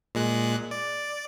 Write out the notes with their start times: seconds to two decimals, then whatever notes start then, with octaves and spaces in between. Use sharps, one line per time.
0.15 A#2 G#3 F#6
0.71 D5